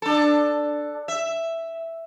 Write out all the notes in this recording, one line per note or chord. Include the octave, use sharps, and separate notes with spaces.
D4 A4
E5